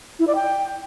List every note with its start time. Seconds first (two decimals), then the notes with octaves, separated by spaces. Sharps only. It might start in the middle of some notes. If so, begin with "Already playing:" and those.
0.19 E4
0.27 D5
0.35 G5